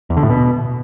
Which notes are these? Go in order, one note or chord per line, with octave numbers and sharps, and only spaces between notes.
E2
D3
A2
B2